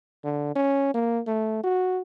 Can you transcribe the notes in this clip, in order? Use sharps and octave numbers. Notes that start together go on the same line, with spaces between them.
D3
C#4
A#3
A3
F#4